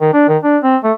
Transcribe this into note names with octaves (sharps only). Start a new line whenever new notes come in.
D#3
D4
D#3
D4
C4
A3